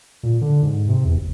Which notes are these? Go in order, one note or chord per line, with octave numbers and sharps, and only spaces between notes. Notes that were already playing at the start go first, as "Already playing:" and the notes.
A#2
D3
G#2
C3
E2
F#1